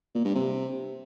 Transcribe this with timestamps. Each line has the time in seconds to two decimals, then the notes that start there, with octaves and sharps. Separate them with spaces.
0.15 A#2
0.25 G2
0.35 C3